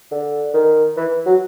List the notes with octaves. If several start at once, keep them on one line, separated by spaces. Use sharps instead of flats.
D3
D#3
E3
F#3